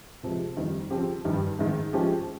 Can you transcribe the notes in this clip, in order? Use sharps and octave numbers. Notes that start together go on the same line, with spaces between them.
C3 F3 G#3
F2 D#3 G3
C#3 F3 C4 G4
G2 D#3 G3
G#2 D#3 G#3
F3 G#3 C#4 G4